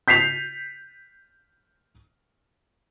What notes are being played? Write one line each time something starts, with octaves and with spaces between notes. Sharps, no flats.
G6 B6 C7 F7